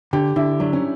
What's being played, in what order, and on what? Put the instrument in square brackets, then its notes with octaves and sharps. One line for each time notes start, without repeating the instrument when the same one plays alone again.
[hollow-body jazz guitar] D3 [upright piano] G4
[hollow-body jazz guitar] D3 [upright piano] E4
[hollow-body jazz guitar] F#3 [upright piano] D4
[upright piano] C#4